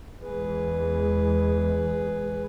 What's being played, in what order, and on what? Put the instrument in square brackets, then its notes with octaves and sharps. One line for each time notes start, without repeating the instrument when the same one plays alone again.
[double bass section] E2 E3 G#3 [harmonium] G#4 B4